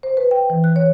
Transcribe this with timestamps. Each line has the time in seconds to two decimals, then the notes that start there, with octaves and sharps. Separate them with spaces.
0.03 C5
0.17 B4
0.31 G5
0.50 E3
0.64 F#6
0.76 C#5